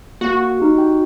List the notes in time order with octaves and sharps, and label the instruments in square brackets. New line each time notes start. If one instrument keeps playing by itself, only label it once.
[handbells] A#3 [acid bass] F#4
[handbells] D#4 G4
G5